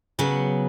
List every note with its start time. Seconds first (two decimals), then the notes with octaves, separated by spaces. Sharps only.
0.19 C#3 F#3 B3